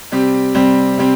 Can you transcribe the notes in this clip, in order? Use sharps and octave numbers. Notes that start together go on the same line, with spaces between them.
C3 G3 C4 G4
C3 G3 C4 G4
C3 G3 C4 G4